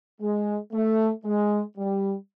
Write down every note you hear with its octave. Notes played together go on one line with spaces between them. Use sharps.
G#3
A3
G#3
G3